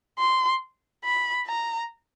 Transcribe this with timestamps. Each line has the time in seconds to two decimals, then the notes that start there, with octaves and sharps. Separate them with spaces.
0.19 C6
1.04 B5
1.47 A#5